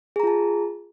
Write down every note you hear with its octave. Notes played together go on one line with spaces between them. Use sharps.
F4 G#4 A5 A#5